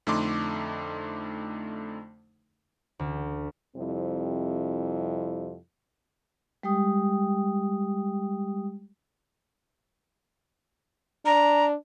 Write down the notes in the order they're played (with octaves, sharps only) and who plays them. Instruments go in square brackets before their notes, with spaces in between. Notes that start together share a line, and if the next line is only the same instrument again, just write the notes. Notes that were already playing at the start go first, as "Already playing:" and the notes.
[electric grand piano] F2 D3 A3 D#4 C6 D6
[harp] D2
[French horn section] F2 C3 G3 C4 E4
[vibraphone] G3 G#3 G4 G5 D#6
[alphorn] D4 [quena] A#5